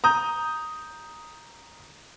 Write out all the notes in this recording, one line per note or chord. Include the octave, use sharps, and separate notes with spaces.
A#5 D#6 G6